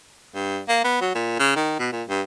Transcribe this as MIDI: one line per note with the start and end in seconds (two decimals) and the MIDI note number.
0.35 0.60 43
0.69 0.81 58
0.84 1.01 59
1.01 1.11 54
1.15 1.38 46
1.39 1.54 49
1.56 1.75 51
1.79 1.88 47
1.92 2.03 46
2.09 2.22 43